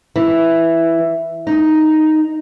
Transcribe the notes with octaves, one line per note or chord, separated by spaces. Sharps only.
E3
D#4